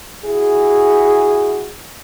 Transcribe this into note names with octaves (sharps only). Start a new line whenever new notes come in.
E4 F#4 G#4